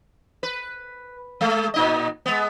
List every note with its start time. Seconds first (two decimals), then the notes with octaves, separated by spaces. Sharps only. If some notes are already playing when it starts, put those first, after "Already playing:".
0.43 B4
1.41 G#3 A3
1.74 A#2 D#4 D#5
2.26 G#3 B3